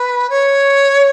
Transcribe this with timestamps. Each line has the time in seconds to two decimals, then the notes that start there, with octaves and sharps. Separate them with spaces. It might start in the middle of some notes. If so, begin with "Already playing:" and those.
Already playing: B4
0.29 C#5